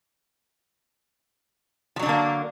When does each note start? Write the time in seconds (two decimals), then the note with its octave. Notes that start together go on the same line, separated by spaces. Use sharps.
1.96 F3
1.99 F#3
2.03 D4
2.06 D3
2.09 A#3